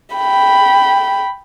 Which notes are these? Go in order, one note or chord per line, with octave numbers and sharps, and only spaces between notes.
G5 B5